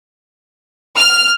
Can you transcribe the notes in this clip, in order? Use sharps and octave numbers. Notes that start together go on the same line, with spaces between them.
F6